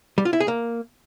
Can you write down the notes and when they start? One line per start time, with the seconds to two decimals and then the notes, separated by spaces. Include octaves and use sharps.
0.18 G3
0.25 F4
0.33 E4
0.40 G#4
0.48 A#3